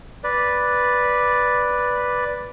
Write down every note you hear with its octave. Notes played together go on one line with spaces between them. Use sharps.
B4 D5